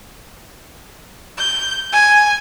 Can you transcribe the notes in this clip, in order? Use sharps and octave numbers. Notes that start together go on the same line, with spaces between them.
G6
G#5